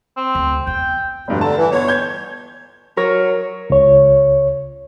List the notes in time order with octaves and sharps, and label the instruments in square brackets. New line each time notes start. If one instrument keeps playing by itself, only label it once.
[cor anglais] C4
[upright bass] D2
[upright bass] E2 [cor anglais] G5
[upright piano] F1 G2 [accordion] B2
[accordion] D3 [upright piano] A5
[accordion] E3
[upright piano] G1 [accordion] C#5
[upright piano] G6 G#6
[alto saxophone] F#3 [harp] A#4 C#5
[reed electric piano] C#2 C#5